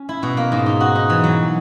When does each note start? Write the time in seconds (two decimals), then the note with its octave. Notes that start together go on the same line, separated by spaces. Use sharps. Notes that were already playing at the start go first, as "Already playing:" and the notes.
Already playing: C#4
0.09 E4
0.23 B2
0.37 A#3
0.52 G#2
0.66 D#4
0.81 F#4
0.95 D#4
1.10 E3
1.24 F#3